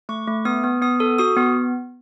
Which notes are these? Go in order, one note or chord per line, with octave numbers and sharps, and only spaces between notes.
A3 C#6
A3
B3 D#6
B3
B3 D#6
A4
F#4 D#6
B3